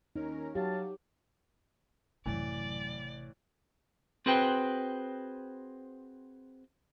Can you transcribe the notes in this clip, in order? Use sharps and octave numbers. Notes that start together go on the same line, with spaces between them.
D#2 C#4 D#4 A#4
F#3 G4 C#5 F5 A5
G#1 F#2 A2 C3 E3 F#3 D5
C4 F#4 G#4 B4 C5 G5